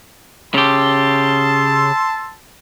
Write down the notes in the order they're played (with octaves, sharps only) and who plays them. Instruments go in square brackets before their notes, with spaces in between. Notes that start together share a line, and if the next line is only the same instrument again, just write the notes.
[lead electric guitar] C#3 G4 [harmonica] A5 C6 E6